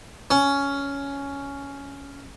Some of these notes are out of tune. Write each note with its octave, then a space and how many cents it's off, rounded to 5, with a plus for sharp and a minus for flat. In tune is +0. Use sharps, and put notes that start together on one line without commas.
C#4 +10